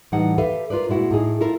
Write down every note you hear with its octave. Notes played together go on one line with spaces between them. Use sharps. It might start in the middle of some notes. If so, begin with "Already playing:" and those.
A2 E3 G3 D#4 F#5
G4 A4 B4 E5 F5
F4 A#4 B4 D5
A#2 G#3 E4 F#4
A2 D#4 G#4
E4 F4 A4 A#4